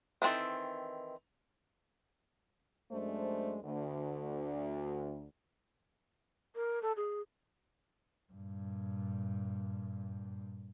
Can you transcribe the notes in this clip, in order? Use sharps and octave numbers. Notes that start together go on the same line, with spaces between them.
D#3 E3 C4 A4
F#2 G#3 A3 D4 C5
D2
A#4
A4
G#4
G2 A#2